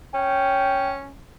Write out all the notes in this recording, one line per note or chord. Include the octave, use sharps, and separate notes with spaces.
C#4 G5